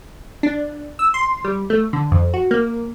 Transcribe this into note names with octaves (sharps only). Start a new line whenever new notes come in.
D4
E6
C6
G3
A3
D3
F2
F#4
A#3